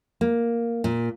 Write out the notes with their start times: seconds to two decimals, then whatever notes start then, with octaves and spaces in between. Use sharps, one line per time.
0.21 A#3
0.84 A#2